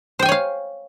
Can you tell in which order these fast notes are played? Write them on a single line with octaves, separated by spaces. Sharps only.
C5 G5 G#5 C#5 F5